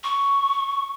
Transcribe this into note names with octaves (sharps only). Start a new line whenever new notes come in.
C#6